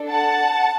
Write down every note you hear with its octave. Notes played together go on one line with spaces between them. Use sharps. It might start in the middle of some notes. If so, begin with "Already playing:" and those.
Already playing: D4 A4
F#5 A5